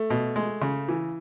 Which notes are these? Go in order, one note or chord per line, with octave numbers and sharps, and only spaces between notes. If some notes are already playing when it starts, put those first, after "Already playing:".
Already playing: A3
B2
G#3
C#3
E3